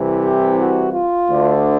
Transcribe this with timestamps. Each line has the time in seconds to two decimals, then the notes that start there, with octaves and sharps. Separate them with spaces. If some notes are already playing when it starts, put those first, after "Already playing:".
Already playing: C2 C3 E3
0.24 G4
0.59 F#4
0.93 F4
1.29 D2 D3